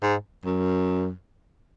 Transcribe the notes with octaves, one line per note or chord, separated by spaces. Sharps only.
G#2
F#2